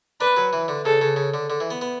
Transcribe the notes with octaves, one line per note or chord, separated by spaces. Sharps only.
D4 B4
F#3
E3
D3
C#3 A4
C#3
C#3
D3
D3
E3
B3
B3